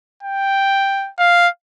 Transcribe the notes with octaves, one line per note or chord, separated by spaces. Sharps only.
G5
F5